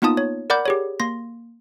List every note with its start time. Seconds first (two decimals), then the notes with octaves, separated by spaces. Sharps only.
0.02 A#3 B3 D#4 F4 A5 D#6
0.17 C#5
0.50 A#4 D5 F#5 B5 D6 G6
0.66 G4 G#4 C#5
1.00 A#3 C6 A#6